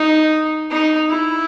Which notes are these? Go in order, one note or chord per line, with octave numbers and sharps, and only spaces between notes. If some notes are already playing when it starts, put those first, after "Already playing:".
Already playing: D#4
D#4
E4